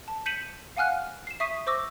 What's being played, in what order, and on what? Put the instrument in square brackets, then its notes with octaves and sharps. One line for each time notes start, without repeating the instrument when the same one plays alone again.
[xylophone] A5
G6 B6 C#7 D#7 E7 F#7
F5 F#5 G#5 F6 F#6
C7 E7
E5 C#6 D#6 B6 C7 D#7
C5 C#6 D6 E6 A#6